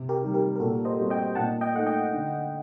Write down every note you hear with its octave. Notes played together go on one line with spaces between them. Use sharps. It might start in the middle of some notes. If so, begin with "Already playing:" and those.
Already playing: C3
G4 A#4
D#3 G3
G4 A#4
A#4
A#2 F#4 A4
C5 D#5
G3 C4 F#4
D#5 G5
A#2 F#5 A5
D#5 G5
A3 D#4 F#5
D#5 G5
D3